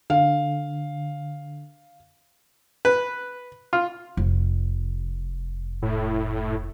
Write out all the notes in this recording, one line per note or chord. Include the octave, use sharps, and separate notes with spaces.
D3 F5
B4
F4
F1
A2